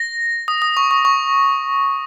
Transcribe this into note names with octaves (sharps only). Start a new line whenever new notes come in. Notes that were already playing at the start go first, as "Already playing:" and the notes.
Already playing: A#6
D#6
D#6
C#6
C#6
C#6